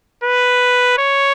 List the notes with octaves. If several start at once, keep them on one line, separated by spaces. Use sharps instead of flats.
B4
C#5